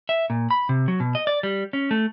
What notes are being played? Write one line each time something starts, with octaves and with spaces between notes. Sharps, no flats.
E5
A#2
B5
C3
F#3
B2
D#5
D5
G3
C#4
A3